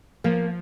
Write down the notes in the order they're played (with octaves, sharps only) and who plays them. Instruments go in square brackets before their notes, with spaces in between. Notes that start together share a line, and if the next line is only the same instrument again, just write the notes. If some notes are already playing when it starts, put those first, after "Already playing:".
[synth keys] F3 [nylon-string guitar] A#3